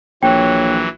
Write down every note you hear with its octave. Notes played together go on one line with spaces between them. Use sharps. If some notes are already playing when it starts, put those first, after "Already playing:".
A#1 E3 F#3 C#5 G5